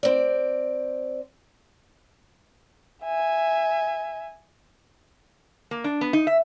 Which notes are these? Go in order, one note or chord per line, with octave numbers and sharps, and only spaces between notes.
C4 D5
E5 G#5
A#3
D4
B3
D#4
E5